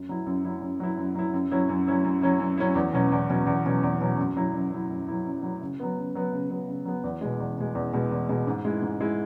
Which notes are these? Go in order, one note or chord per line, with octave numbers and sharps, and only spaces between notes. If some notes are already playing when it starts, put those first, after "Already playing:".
Already playing: F#2
F#3 E4
F#2
F#3 E4
F#2
F#3 E4
F#2
F#3 E4
F#2
F#3 C#4 E4
F#2
F#3 C#4 E4
F#2
F#3 C#4 E4
F#2
F#3 C#4 E4
E2
B2 F#3 C#4
E2
B2 F#3 C#4
E2
B2 F#3 C#4
E2
B2 F#3 C#4
F#2
F#3 E4
F#2
F#3 E4
F#2
F#3 E4
F#2
F#3 E4
C#3
F#3 B3
C#3
F#3 B3
C#3
F#3 B3
C#3
F#3 B3
E2
B2 G#3
E2
B2 G#3
E2
B2 G#3
E2
B2 G#3
G#2
G#3 E4
G#2
G#3 E4